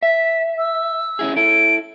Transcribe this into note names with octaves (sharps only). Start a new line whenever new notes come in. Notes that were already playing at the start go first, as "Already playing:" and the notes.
E5 B6
E6
C#4 E4 G#4
E4 A4 D7